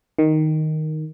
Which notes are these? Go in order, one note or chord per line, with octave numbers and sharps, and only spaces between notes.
D#3